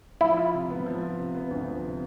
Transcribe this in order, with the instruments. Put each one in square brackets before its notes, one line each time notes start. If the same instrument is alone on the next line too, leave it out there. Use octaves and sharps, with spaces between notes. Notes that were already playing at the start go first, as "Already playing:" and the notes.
[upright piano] F3 [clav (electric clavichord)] E4
[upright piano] F4
C3
B3
F3
F4
C3
B3
D2
F3
C3